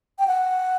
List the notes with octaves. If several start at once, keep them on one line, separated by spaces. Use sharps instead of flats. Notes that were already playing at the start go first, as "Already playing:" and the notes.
G5
F#5